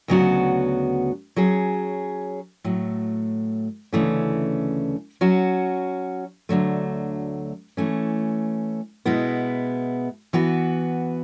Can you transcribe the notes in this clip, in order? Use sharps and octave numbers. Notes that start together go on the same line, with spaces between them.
D2 C#3 F#3 B3 F#4
F#3 C#4 G#4
A2 F#3 A3
D2 C#3 E3 A3 C#4
F#3 C#4 F#4
D2 D3 F#3 A3
E3 A3 C#4
B2 G#3 B3 E4
E3 B3 F#4 B4